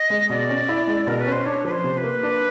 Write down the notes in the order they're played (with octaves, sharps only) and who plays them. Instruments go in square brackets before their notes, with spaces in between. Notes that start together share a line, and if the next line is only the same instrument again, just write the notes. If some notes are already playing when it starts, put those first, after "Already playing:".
Already playing: [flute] D#5
[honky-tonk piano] G#3
[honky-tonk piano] B2 [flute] D5
[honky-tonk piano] C#4
E4
G#3
[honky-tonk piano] B2 [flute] A#4
[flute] B4
[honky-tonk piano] C#4
[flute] C5
[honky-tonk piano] D4 [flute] C#5
[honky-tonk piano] F3 [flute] B4
[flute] C5
[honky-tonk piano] C3
[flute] B4
[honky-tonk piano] A#3
D4